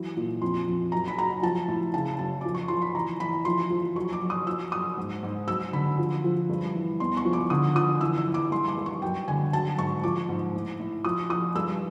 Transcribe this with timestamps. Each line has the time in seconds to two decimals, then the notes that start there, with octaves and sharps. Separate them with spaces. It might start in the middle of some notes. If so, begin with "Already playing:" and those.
Already playing: E3 F#3
0.17 A#2
0.42 F2 C6
0.68 F2
0.92 F#2 A#5
1.08 B5
1.18 F#3 A#5
1.43 F3 A5
1.68 A2
1.94 C#3 A5
2.19 F#2 A5
2.41 F3 D6
2.55 C#6
2.68 F3 C6
2.82 B5
2.95 E3 A#5
3.20 E3 B5
3.45 F3 C6
3.70 F3
3.96 F#3 C#6
4.13 D6
4.21 F#3
4.30 D#6
4.46 F3 E6
4.72 F#2 D#6
4.98 G#2
5.23 G#2
5.47 F#3 E6
5.73 D3 B5
5.99 F3
6.24 F3
6.50 G2
6.75 E3
7.00 E2 C6
7.17 C#6
7.25 F3
7.33 D6
7.50 D3 D#6
7.75 F3 D#6
8.01 E3 E6
8.17 E6
8.26 E3
8.34 D6
8.52 G2 C6
8.68 D6
8.77 G2
8.86 C#6
9.02 F#2 G5
9.28 D3 G#5
9.53 F#3 A5
9.78 G#2 C#6
10.03 F3 D6
10.29 G#2
10.55 A2
10.80 A2
11.05 F3 D#6
11.29 F3 D#6
11.55 G2 E6